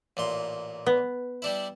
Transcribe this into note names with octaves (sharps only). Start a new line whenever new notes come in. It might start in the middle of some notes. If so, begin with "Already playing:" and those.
A1 A#2 C6
B3
G3 D4 E4